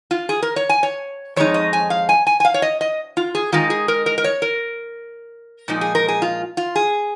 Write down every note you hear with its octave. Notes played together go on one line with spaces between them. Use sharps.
F4
G#4
A#4
C#5
G#5
C#5
F2 D#3 G#3 D#4 C#5
D#5
G#5
F5
G#5
G#5
G#5
F5
C#5
D#5
D#5
F4
G#4
D#3 G#3 D#4 F4
G#4
A#4
A#4
A#4
C#5
A#4
A#2 F3 G#3 D#4
G#4
A#4
G#4
F4
F4
G#4